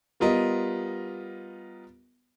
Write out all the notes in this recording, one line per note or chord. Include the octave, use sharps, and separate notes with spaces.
G3 B3 F4 A#4 D#5